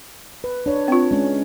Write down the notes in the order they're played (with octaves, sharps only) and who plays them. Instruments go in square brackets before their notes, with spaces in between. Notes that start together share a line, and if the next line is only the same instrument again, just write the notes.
[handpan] B4
D4 C#5
[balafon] C4 F4
[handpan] G#3 C#4